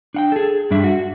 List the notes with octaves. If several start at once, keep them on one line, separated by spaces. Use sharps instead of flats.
D4 F#5 G5
G#4 A4
G2 G3 D4 E5
F#4